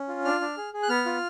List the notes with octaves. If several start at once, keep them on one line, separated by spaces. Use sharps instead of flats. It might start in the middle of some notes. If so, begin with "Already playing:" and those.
Already playing: C#4
F4
D4 F6
D4
G#4
G#4
F#6
B3 F6
F4